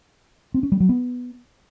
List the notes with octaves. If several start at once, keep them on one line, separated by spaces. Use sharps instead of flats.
C4
C#4
G3
F#3
B3